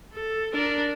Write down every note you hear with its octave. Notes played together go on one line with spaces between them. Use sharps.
A4
D4 A#4